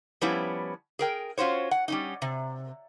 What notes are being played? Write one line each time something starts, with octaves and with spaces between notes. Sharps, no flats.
F3 G3 B3 C#4 E4
G#4 A#4 G5
C#4 F4 F#4 C5 C#5
F#5
G3 C#4 D#4
C3